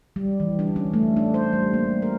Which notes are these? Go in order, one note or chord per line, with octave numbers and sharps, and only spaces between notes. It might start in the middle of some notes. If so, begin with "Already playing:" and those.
G3
E3
D4
C#4
A3
D4
C5
G3
A#3
A#4